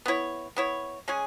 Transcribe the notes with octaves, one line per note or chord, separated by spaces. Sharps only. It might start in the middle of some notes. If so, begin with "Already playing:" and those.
B3 E4 C#5
B3 E4 C#5
G#3 C#4 G#4